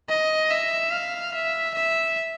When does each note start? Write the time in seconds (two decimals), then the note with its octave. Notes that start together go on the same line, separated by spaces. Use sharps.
0.10 D#5
0.51 E5
0.93 F5
1.34 E5
1.75 E5